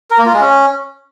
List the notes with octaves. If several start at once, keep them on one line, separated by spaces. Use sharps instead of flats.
A#4
A#3
F4
G#3
C#4